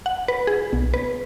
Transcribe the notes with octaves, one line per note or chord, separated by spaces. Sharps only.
F#5
B4
G#4
B1
B4